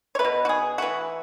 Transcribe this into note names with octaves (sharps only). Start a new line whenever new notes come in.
C#5
A3 B4
B2
F#4
G#4
E3 A3 F#4